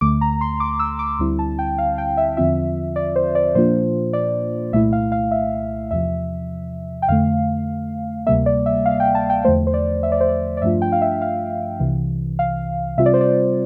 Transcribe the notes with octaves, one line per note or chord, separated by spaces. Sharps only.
D2 D3 A3 D6
A#5
C6
D6
E6
D6
D2 D3 G3 C4 E4
A5
G5
F5
G5
E5
E2 D3 F3 C4 F4 E5
D5
C5
D5
A#2 F3 A#3 D4 F4 C5
D5
C2 A#2 A3 E4 E5
F5
F5
E5
E2 C3 F3 E5
G5
F2 D3 A3 F5
D2 C3 G3 A#3 E5
D5
E5
F5
G5
A5
G5
E2 D3 F3 A3 C5
C5
D5
E5
D5
C5
D5
D5
G2 F3 A3 D4 F4 E5
G5
F5
E5
F5
C2 C3 E3
F5
C3 G3 C4 F4 E5
D5
C5
D5